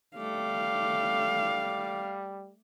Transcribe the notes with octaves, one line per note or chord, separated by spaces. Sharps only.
G3 A3 F5 D6